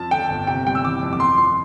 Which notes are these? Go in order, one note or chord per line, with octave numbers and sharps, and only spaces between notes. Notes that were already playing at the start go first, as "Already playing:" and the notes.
Already playing: F2 F3 A5
D3 G5
G1
C3 G5
G3 G5
E6
E3 D6
F2
D6
F2 C6
F3 C6